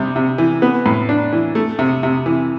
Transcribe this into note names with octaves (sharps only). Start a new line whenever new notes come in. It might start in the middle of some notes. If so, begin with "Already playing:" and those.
Already playing: C3 G3
C3
E3
B3
A2
D4
E3
A3
C3
C3
E3